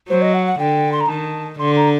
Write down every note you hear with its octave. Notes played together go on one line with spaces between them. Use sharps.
F#3 C5
D#5
F#5
F#5
D3 G5
C6
A#5
D#3 A5
D3 C6
A#5